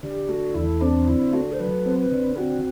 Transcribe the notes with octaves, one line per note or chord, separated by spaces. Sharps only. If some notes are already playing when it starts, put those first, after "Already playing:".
D3 G4
A3 F#4
E2 E4
C4 D4
D3 E4
A3 F#4
C5
F#3 B4
C4
B4
D3
C4 F#4